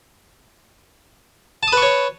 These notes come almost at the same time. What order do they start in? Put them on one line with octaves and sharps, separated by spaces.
A5 D#6 B4 C#6 C#5